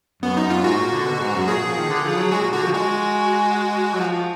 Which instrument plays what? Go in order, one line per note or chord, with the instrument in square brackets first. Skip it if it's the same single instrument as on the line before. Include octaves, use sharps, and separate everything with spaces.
[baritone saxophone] F#2 [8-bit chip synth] B3
[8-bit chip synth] D#4
[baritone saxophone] F#2
[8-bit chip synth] F4
[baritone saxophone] G#2 [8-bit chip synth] F#4
[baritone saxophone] A#2
D3
B2
G#2
F#2
[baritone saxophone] A#2 [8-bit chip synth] G#4
[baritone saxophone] F3
D#3
D3
F3
F#3
[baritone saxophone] G#3 [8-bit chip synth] F#4
[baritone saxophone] A#2
[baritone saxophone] D3 [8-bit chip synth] F#4
[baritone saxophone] F3
[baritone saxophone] G#3 [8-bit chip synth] F#4
[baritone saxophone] F#3
F3
F3